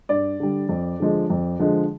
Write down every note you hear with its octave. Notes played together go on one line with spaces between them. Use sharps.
G2 D5
D3 G3
F2
D3 F3 G#3
F2
D3 F3 G#3